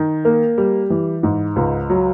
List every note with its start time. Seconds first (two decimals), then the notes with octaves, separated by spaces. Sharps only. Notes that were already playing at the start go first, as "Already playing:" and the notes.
Already playing: D#3
0.25 A#3
0.58 G3
0.90 E3
1.23 G#2
1.56 C#2
1.90 F#3